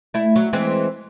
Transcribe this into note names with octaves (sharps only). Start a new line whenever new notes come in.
A3 E4
F#3
E3 G#3 C4